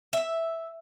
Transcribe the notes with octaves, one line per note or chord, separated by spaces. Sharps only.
E5